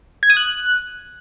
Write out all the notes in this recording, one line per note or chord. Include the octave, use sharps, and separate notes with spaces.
G#6
D#6
F#6